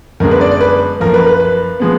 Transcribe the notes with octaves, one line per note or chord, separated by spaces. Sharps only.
F#2 D3 G#3 B3 A#4
B4
D5
D5
B4
F#2 F3 A#3 A#4
B4
B4
B4
F3 G#3 B3